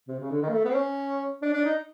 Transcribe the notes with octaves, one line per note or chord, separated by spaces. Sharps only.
C3
C#3
D3
D#3
A#3
A3
B3
C4
C#4
D4
D4
D#4